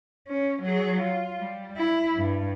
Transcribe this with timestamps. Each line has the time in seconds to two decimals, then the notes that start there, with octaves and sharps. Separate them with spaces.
0.28 C#4
0.63 F#3 G#4
1.01 F4
1.39 G3
1.77 E4
2.16 G2